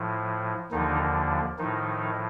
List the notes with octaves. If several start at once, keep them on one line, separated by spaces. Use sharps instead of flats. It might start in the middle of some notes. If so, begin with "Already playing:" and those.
Already playing: A2 F3
D#2 D3 D#3 F3 D#4
A2 D#3 F3 D#4